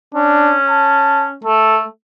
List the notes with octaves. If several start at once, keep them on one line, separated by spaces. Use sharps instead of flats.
C#4 D4
A5
A3 A4